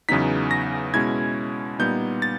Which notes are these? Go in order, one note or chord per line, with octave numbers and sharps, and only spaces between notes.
E2 C#3 F#3 B3 D#4 B6
A#6
B2 G#3 C#4 E4 G#6
A#2 G3 B3 D#4 G6
A6